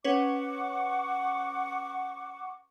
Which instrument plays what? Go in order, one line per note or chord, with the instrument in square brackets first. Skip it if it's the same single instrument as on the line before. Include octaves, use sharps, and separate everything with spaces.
[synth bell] C#4 B4 C#5 [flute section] F#5 C#6 D6